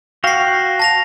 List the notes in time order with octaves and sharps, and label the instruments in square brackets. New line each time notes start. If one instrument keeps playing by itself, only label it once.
[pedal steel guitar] F#4 F5 G5 [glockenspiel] A#6 C7
[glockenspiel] A5 A#6 F7